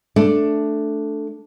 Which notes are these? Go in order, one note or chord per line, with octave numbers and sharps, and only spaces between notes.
A3 D4